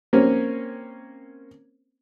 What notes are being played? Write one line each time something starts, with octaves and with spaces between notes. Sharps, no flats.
A#3 C4 C#4